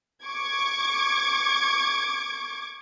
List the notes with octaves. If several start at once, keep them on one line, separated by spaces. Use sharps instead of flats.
C#6 D6 G#6